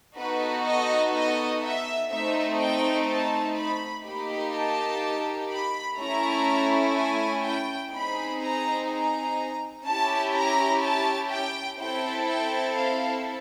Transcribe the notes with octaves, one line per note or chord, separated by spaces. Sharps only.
B3 D#4 F#4 A4 B4
D#5
D#5
E5
A3 C4 D#4 E5
G5
A5
B5
A#3 D#4 G4 B5
A5
B5
A3 C#4 E4 A#5
G#5
G5
C4 D#4 G#4 B5
A#5
A#5
C#4 E4 G4 A5
A#5
A5
G5
C4 E4 A4 G5
G5
F5